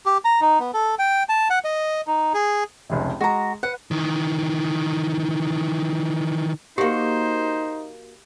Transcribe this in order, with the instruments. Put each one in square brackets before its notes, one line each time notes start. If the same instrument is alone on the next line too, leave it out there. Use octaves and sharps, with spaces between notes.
[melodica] G4
A#5
D#4
B3
A4
G5
A5
F#5
D#5
D#4
G#4
[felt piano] F1 C#2 C3
[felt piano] G#3 [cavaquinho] F#4 A#5
[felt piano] B4 [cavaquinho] F#5
[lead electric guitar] D#3 E3
[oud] A#3 F#4 [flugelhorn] D#4 [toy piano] G4 [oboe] C5